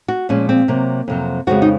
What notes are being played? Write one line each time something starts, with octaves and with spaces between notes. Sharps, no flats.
F#4
A#2 F3 G#3 C#4
C4
C3 F#3 A#3
F2 C3 F#3
F2 C#3 F3 G#3 F#4
D#4